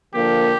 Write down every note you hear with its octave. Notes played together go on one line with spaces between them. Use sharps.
D3 F3 A#3 G4